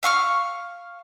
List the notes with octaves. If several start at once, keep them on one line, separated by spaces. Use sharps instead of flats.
E5 F5 C#6 F6